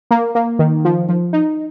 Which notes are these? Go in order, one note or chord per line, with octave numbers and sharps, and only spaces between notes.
A#3
A#3
D#3
F3
F3
D#4